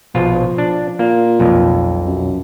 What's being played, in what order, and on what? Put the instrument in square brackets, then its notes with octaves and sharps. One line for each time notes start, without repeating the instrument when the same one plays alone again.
[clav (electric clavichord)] A#1 B2 F4 [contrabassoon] F3
[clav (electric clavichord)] D4
[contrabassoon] A#2 [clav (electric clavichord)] A#3
[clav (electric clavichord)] B1 F2
[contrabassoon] F#2